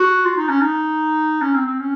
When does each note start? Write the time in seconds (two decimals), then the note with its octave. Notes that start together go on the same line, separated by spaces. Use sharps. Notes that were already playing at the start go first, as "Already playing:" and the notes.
Already playing: F#4
0.25 F4
0.37 D#4
0.49 C#4
0.61 D#4
1.41 C#4
1.54 C4
1.66 C4
1.79 C#4